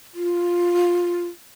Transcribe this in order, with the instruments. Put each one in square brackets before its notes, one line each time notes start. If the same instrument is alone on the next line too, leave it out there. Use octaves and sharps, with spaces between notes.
[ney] F4